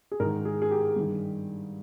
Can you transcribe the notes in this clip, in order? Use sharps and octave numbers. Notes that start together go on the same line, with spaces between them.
G#4
G#2 D#3 A#4
G#4
G#4
G4
G2 D#3